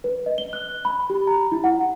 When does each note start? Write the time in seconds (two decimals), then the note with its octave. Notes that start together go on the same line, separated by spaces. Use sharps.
0.04 B4
0.26 D#5
0.38 G7
0.53 F#6
0.85 B5
1.10 G4
1.27 A#5
1.52 E4
1.64 F#5